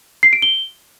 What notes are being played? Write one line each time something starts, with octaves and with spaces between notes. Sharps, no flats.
C7
D7
G7